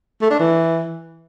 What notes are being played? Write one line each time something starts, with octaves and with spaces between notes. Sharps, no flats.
A3
D4
E3